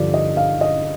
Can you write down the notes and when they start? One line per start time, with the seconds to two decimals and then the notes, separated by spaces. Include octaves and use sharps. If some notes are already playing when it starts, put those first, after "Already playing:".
Already playing: G2 D3 F3 D5
0.14 D#5
0.37 F5
0.61 D#5